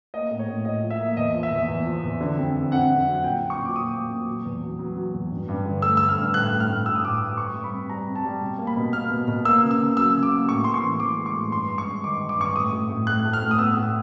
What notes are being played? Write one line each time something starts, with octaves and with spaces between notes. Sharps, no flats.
A#3 D#5
A2
C#5
A2
A2 D#5
F3
E5
A#3
E2 D#5
F3
E5
E2
E2
F3
E2
D3
F2
F2
F2 F#5
F2
F#3
F#5
A#2 G5
A#2
C#6
A#2
D6
A#3 D#6
A#3
A#2
F#3
E2
F#3
F#3
F#3
E2
G2
G2
D3
A3 E6
A3 E6
F6
G2
A2 F#6
A2
F6
A2
A2 E6
D#6
A2 D6
D#6
A2
G3 C#6
G3
B5
C3
G3 A#5
C3
A5
G3
B2
A#3
B5
B2
A#3 F6
B2
B2
A#3 E6
C#3
E6
C#3
F#3 E6
C#3
D6
A#3
A2 C#6
A2 C6
C#6
E3
E3 D6
G#3
C#6
A2
G2 C6
G#3
C#6
G2
D#3 D6
D#3
D6
G2 C#6
D6
A2 D#6
A2
A2
A2 F#6
A3
F6
A2
D#6
B3 E6
A2